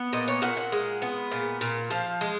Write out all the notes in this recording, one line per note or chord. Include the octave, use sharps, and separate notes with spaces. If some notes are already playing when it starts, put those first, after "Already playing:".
Already playing: B3
A#2 D#5
C#5
A#2 F#5
F#5
G#3
B3
A#2
A#2
F3 F5
G#3